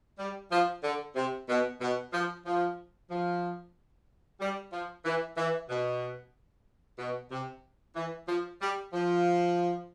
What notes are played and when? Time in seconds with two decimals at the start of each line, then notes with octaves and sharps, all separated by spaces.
0.19 G3
0.51 F3
0.83 D3
1.16 C3
1.49 B2
1.81 B2
2.13 F3
2.45 F3
3.10 F3
4.40 G3
4.72 F3
5.05 E3
5.37 E3
5.69 B2
6.98 B2
7.31 C3
7.95 E3
8.28 F3
8.61 G3
8.93 F3